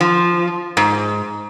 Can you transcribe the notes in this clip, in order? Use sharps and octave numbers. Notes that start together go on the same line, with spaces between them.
F3
G#2